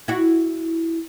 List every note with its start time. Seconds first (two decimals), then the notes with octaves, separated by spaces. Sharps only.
0.08 E4 F#4